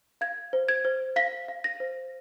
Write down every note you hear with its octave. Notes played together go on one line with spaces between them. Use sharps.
F5 G#6
C5
G#6
C5
F5 B6
F5
A#6
C5